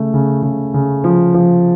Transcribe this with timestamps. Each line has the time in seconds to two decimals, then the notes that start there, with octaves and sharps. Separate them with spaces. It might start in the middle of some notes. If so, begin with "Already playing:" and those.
Already playing: C#3 A3
0.14 C#3
0.43 C#3
0.74 C#3
1.04 F3
1.34 F3